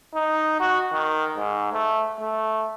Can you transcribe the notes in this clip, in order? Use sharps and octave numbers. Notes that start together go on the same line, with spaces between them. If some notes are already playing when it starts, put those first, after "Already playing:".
D#4
F#4
D#3
G#2
A3
A3